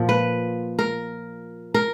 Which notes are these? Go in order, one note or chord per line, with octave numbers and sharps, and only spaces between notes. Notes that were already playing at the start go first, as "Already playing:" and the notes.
Already playing: A#2 F3
B4
A#4
A#4